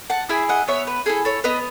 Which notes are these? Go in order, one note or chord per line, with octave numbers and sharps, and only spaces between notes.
F#5 A5
E4 G#4 E5 G#5
D#5 F#5
B3 C#5 E5
B4
E4 G#4 A4
A4 C#5
B3 B4 D#5